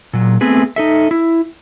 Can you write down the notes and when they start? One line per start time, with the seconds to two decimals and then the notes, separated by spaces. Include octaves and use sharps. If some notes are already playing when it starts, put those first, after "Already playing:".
0.13 A#2 F#3
0.41 A3 B3 C4 G#4 B4
0.76 D#4 A4 E5
1.11 E4